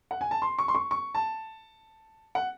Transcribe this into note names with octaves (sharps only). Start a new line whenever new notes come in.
F#5
G#5
A5
C6
C#6
C6
C#6
C#6
A5
F#5